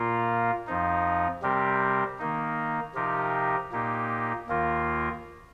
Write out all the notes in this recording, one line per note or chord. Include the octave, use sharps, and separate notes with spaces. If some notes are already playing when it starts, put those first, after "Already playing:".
Already playing: A#2 A#3 F4 A#4
F2 F3 D#4
C3 G3 C4 G4 A#4
D#3 A#3 D#4
C3 F3 D#4 G4 A#4
A#2 A#3 D#4 G4
D#2 D#3 A#3 F4 A#4